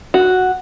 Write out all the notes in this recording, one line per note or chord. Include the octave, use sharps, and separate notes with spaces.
F#4